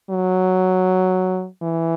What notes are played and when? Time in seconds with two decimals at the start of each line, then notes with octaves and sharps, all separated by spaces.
0.10 F#3
1.63 E3